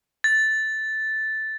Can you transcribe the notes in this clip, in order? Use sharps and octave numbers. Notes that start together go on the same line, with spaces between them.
A6